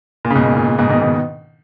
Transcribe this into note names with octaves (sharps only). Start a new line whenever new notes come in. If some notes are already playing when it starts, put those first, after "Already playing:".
A#2
C#3
G#2 B2
A#2
A#2
A#2
G#2 B2
B2 D#3
B2 D#3